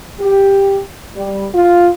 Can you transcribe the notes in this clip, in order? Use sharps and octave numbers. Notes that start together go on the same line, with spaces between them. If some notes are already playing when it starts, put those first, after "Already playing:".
G4
G3
F4